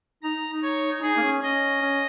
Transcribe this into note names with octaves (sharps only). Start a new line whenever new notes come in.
D#4 A#5
D#4
C#5
D#4 G#4
A#3
C#4
C#4 D#5
C#4